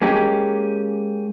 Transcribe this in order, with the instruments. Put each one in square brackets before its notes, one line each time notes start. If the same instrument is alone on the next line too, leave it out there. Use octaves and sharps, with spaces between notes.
[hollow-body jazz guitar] G#3 A#3 C#4 G4